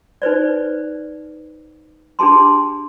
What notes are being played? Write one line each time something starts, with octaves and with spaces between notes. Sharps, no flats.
D#4 B4 C5 D5
D4 G4 G#4 A5 C6